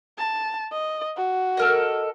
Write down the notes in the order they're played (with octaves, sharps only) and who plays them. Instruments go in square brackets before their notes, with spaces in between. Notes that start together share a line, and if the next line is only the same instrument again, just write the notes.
[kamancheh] A5
D#5
F#4
[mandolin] A4 A#4 D#5